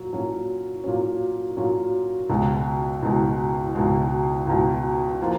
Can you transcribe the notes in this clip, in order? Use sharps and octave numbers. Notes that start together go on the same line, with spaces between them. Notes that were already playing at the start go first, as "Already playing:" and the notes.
Already playing: A#2 F#3
A#2 F#3 C#4
A#2 F#3 C#4
A#2 F#3 C#4
C#2 B2 G#3
C#2 B2 G#3
C#2 B2 G#3
C#2 B2 G#3
F3 A#3 F4